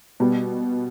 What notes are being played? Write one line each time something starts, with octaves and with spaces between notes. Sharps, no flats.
B2 G3 B3